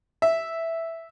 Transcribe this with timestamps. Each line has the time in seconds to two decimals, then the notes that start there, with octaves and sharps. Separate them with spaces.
0.22 E5